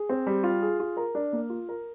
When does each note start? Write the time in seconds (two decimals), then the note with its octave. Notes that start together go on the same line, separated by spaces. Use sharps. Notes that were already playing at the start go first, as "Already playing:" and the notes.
Already playing: G#4
0.09 C4
0.27 G3
0.44 F4
0.62 G#4
0.80 F4
0.97 A#4
1.15 D4
1.33 A#3
1.50 F4
1.69 A#4